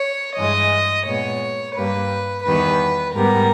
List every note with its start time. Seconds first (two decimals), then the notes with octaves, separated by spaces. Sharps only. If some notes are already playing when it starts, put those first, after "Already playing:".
Already playing: C#5
0.37 G2 E3 G#3 D#5
1.06 A#2 G#3 B3 C#5
1.76 G2 G3 A#3 B4
2.45 E2 D#3 G3 B3 B4
3.14 G#2 G3 B3 A#4